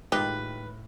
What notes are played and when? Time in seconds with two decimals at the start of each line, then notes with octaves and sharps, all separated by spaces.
0.12 A2 D#3 G#3 D#4 F4 G4 B4